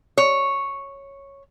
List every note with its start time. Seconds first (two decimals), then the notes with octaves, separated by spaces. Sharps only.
0.18 C#5